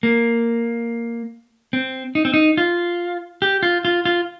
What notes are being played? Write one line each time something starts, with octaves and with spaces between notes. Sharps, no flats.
A#3
C4
D#4
C4
D#4
F4
G4
F4
F4
F4